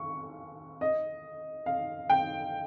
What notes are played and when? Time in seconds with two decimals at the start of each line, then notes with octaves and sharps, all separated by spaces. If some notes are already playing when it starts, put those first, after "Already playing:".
Already playing: C#6
0.81 D#5
1.66 F5
2.10 G5